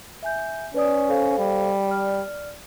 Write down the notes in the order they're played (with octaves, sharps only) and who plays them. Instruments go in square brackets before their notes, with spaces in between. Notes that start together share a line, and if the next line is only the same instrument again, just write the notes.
[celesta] E5 G#5 G6
[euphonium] C#4 [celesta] B4 D5 D#6
[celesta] A4 C5 F5
[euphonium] G3
[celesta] D5 F6